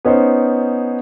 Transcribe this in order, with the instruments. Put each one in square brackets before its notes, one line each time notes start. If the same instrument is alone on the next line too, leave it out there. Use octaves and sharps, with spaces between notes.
[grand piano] B3 C#4 D#4 C5